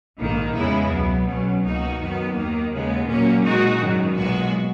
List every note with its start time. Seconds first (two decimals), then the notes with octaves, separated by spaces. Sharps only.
0.17 A#1 G#2 D#3 A#3
0.54 E2 C#3 G#3 B3 E4
0.90 C#2 B2 F#3 B3
1.26 B1 B2 F#3 C#4
1.62 C#2 B2 A#3 D#4 F#4
1.99 F#2 D#3 F#3 B3
2.34 D#2 D#3 A#3
2.72 D#2 C#3 G#3 B3
3.07 A#2 F#3 A#3 C#4
3.44 A#2 G#3 D#4 F#4
3.80 G#1 F#2 D#3
4.16 B1 A#2 G#3 B3 F#4